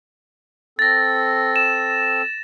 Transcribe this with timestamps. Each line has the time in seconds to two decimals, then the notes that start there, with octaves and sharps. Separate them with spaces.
0.79 C4 A4 A6 A#6
1.56 E7